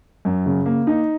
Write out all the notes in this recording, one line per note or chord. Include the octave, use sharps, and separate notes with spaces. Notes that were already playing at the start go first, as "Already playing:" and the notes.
F#2
C#3
A#3
D#4